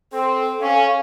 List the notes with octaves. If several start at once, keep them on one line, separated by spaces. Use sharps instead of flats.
C4 A4
C#4 F5